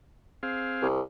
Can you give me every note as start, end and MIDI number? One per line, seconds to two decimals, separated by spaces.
0.43 0.88 60
0.43 0.88 68
0.43 0.88 77
0.82 1.01 36